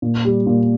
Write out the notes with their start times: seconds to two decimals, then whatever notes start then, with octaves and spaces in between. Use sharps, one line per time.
0.02 A#2
0.25 G3
0.46 A#2